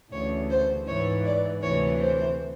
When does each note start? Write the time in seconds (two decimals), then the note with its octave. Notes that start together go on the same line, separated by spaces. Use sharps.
0.11 D2 C#3 E3 C#5
0.49 C5
0.87 G#2 E3 C#5
1.24 D5
1.62 D2 C3 E3 C#5
2.00 C5